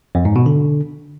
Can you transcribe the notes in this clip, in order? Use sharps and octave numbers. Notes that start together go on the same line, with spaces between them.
F2
G#2
B2
D3